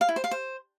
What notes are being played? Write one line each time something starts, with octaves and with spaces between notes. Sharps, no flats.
F5
E4
C5
F5
C5